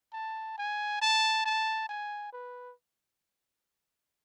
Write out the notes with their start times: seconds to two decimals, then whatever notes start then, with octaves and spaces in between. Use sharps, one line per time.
0.13 A5
0.58 G#5
1.01 A5
1.45 A5
1.89 G#5
2.33 B4